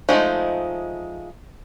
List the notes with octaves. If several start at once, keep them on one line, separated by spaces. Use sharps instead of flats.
F3 G#3 A3 D#4